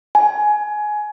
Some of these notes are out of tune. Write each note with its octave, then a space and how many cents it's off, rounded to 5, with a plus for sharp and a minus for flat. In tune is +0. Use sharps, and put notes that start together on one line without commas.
G#5 +20